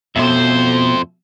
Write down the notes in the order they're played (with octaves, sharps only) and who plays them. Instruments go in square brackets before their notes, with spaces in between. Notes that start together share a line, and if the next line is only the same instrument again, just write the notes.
[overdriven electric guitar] F2 C5 [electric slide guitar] B2 A3 E5